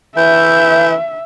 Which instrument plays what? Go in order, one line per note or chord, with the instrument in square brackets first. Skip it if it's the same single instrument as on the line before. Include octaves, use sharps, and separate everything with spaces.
[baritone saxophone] E3 [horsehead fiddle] E5 [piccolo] G6